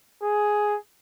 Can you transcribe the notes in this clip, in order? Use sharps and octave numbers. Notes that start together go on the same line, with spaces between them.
G#4